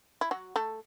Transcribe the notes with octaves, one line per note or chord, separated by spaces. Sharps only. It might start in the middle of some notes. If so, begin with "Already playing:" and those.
E4
F#3 F#4
A3 A4